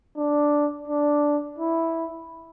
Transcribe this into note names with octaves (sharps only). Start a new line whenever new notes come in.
D4
D4
E4